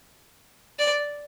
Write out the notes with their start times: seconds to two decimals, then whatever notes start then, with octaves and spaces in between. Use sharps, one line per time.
0.79 D5